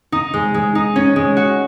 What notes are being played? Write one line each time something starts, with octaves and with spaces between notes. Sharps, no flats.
D#4
G#3
G#3
D#4
C#4
G#3
F#4